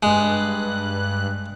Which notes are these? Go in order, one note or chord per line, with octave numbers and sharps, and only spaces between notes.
G2 G#3 F#6